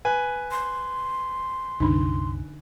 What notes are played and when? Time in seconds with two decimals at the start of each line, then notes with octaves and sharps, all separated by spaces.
0.05 B4 G#5
0.51 C6
1.80 C2 F#2 D3 D4 D#4